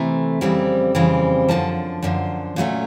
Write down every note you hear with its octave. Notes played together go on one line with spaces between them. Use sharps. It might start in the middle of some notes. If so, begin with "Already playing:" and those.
Already playing: C3 E3 A3 A#5
F2 C#3 E3 G3 C4
F2 C#3 E3 G3 C4
F#2 D3 F3 A5
F#2 D3 F3
A#2 F#3 A3 C#4